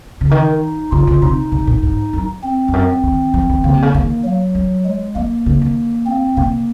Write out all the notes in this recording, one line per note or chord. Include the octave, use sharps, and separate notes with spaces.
C#3
D#3 D#4
C#3 F4
C#3
C3 D#4
C3
A#2
G#2
F#2
C4
F2
F#2
D#3
F3
D#3
C#3 A#3
C3
C#3
D#3 A#3
F#3
G#3
G#3
F3 A#3
C#3
D#3
C4
C3 A#3